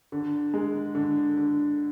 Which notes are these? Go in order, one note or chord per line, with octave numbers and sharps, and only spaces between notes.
D3
G#3
D3
D3